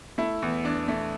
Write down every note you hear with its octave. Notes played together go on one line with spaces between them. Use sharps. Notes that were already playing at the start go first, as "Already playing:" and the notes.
A3 E4
E2
E2 D4
A3